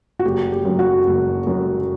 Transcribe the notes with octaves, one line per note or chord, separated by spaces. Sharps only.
F#4
F#1 G4
G4
F#2 F#3
F#4
F#1
F#2 F#3